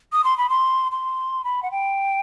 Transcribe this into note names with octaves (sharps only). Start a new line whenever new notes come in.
D#6
C6
B5
C6
C6
B5
F#5
G5